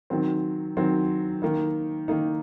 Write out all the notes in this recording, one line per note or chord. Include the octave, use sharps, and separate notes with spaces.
D#3 F#3 C4
D#3 F#3 C4
D#3 A#3 D#4
D#3 A#3 D#4